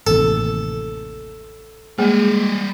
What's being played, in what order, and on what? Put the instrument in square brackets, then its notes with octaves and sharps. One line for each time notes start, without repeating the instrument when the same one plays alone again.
[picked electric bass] A1 D#2 C3 [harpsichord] A4
[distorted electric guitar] G3 D#5 [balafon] G#3 A#3 G#4